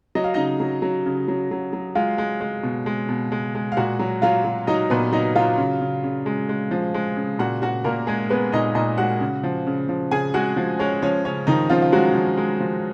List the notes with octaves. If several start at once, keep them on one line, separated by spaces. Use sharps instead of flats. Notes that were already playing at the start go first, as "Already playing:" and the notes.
F#3 D#5
F5
C#3 D#4 D#5
F#3
F#3
C#3
F#3
F#3
F#3
G#3 F4 F5
G#3
G#3
B2
G#3
B2
G#3
G#3
F5
A#2 F#4 F#5
F#3
F#3 F4 F5
F#3
F#3 D#4 D#5
A#2 B3 B4
F#3 D#4 D#5
F#3 F4 F5
C#3
C#3
C#3
G#3
G#3
F3
G#3
C#3
A#2 F#4 F#5
A#2 F#4 F#5
A#2 A#3 A#4
G#3 G#4
G#3 B3 B4
A#2 D#4 D#5
A#2 D#4 D#5
G#3 F#4 F#5
C#3
F3
C#3
F3
C#3 G#4 G#5
G#3 F#4 F#5
F3
G#3 C#4 C#5
F3 C#4 C#5
C#3 C#4 C#5
D#3 F3 D#4
C#3 F3 F4
F4
F#3 G#3 F#4
F3
G#3
F3